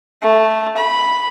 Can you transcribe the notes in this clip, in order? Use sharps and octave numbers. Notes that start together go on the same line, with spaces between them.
A3
B5